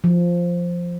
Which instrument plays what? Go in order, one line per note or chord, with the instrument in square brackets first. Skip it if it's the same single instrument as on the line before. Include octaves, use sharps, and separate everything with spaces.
[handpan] F3